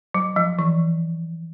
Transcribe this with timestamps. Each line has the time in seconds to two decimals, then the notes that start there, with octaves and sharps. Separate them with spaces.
0.14 F#3
0.36 F3
0.59 E3